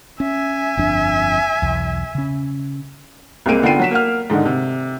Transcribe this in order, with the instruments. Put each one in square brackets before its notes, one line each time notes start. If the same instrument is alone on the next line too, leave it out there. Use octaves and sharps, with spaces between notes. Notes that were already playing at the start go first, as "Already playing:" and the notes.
[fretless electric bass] C#4 [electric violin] E5 G#5
[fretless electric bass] G1 F2 D4
B1 E2
C#3 C#4
[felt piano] C2 C3 G#3 A#3 D7 D#7
D3 B3 F4 G5 C7 D#7
F#3 B6 E7
A#3 F#5 F6
G#2 D3 D#3 D#4
C3